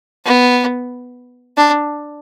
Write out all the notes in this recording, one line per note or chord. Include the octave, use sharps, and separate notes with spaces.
B3
D4